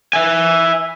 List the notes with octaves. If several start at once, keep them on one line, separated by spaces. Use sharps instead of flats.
E5 G#5